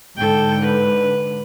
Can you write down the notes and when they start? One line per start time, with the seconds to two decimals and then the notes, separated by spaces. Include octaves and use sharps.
0.17 G#2 D3 A4 G5
0.62 B4